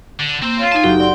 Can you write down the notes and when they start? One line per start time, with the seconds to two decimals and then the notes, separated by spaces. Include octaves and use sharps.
0.20 D3
0.42 A#3 C4 C5 E6
0.59 F4 C#5
0.72 D#4 F5 G#5 A5
0.84 F#1 D#4 F#4 G4 G5
1.00 C4 D5 F#5 C6